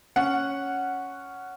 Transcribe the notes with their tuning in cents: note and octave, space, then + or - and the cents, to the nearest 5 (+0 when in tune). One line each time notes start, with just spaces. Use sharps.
C#4 +0 F#5 +0